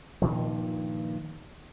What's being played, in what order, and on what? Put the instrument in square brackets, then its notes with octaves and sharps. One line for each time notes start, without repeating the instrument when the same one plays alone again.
[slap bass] G2 A#2 D#3 F3